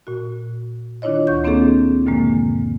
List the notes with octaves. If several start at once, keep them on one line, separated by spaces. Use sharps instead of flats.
A#2 F#4
D#3 D4 E4 F4 C#5 D#5
D2 C#6 G6
A#3 C4 D4 E4 G#4 A4
F#2 A#2 D3 E3 G#3 A#3